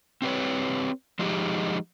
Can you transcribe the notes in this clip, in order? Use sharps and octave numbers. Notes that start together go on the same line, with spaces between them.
C4 G4 B4 C#5
F3 G#3 D#4 G4